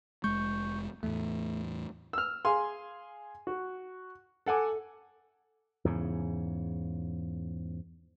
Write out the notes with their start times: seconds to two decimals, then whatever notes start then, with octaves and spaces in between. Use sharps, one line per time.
0.24 F1 G#3 C#6 G6
1.03 E2 A2 A3
2.13 E6 F6
2.45 G#4 F5 G#5 C6
3.47 F#4
4.46 A4 F#5 G#5 D6
5.85 E2 G#2 C#3